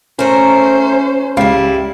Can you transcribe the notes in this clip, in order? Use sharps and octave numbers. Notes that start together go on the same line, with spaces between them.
A3 C#4 A#4 C5
C#2 G3 E4 F5 C7